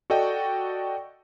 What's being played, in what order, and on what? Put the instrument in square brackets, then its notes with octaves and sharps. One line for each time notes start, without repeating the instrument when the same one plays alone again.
[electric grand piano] F#4 A4 D5 D#5 G5